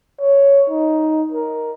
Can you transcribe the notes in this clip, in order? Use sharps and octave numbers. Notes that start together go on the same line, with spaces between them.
C#5
D#4
A#4